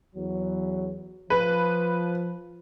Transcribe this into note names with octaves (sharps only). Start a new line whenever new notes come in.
E2 F#3
F3 B4